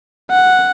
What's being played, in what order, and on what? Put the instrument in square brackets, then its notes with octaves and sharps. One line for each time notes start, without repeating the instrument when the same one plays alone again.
[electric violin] F#5